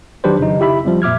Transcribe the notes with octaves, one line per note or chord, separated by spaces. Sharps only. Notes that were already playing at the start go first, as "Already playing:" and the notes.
D#3 F#3 D4 G4 B4 C5
C#3 D#4
E4 G4 E5 B5
F3 G3 C4
A#2 E5 D6 F6 G#6